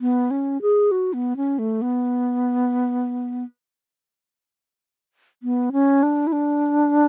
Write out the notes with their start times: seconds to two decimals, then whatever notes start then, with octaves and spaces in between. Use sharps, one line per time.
0.01 B3
0.31 C#4
0.62 G#4
0.91 F#4
1.13 B3
1.37 C#4
1.59 A3
1.82 B3
5.43 B3
5.72 C#4
6.03 D4
6.27 E4
6.33 D4